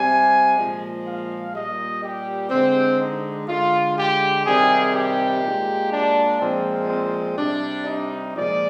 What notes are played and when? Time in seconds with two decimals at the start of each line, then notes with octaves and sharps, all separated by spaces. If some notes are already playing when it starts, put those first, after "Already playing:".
Already playing: C3 G3 G#5
0.56 A#2 F3 G#3
1.06 F5
1.54 A#2 G3 D#5
2.03 G4
2.51 D3 G#3 C4
3.00 D#4
3.48 D3 G#3 F4
3.97 G4
4.45 C3 D#3 G3 G#4
4.94 G4
5.42 A#2 G#3
5.91 D4
6.39 A#2 F3 G#3 C4
6.88 C4
7.37 C3 G3 D4
7.85 D#4
8.34 A#2 F3 G#3 D5